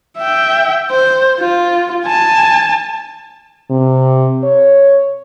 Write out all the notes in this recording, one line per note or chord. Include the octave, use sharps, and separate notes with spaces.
E5 G5
C5
F4
G#5 A5
C3
C#5